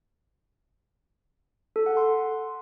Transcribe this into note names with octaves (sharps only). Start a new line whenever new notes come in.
A4
F#5
C6